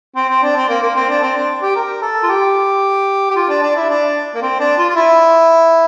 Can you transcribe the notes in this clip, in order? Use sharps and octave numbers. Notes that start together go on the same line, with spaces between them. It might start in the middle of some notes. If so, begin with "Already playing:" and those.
C4
C4
D4
C4
A#3
A#3
C4
D4
C4
D4
G4
A#4
A4
F4
G4
G4
F4
D4
D4
E4
D4
A#3
C4
D4
F4
F4
E4